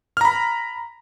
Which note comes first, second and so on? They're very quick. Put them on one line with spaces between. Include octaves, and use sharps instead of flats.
F6 A#5 B5